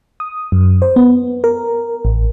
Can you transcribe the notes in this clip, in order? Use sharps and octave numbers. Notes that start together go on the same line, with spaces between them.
D#6
F#2
C5
B3
A#4
A1